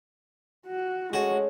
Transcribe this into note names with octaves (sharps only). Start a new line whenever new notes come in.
F#4
G#3 A3 C#4 F#4 C#5